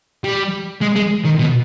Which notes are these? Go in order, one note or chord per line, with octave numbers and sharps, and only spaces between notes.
G3
G#3
G#3
D#3
B2